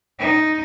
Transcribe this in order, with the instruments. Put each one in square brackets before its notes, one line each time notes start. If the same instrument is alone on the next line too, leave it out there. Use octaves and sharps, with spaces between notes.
[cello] D#4